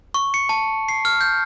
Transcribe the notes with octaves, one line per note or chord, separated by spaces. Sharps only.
C#6
C#7
A5
C7
F6
G6